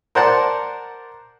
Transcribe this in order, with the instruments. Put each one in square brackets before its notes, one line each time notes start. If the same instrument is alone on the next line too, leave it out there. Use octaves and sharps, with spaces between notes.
[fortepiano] A#4 C5 D5 F#5 A5